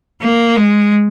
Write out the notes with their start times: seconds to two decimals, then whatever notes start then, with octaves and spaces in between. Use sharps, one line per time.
0.22 A#3
0.57 G#3